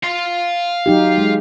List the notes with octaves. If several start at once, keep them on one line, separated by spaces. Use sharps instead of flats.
F5 C6
F#3 D#4 G4
G#3